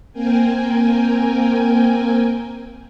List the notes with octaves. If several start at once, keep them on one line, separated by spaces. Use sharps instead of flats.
A#3 C4 A#4 G5 G#5